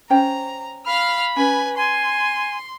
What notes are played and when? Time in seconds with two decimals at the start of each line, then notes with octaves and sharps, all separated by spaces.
0.10 C#4 C5 G5 A#5
0.86 F5 B5 F6
1.36 C#4 B4 G#5
1.77 G#5 C6